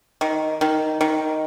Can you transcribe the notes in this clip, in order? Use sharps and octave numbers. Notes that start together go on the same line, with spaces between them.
D#3
D#3
D#3